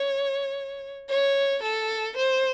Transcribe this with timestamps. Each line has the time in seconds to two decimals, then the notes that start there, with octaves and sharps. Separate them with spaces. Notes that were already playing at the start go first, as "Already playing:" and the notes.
Already playing: C#5
1.09 C#5
1.63 A4
2.17 C5